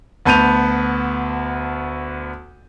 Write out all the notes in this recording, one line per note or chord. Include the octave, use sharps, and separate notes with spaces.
D2 B3 A5 G6 D#7 F7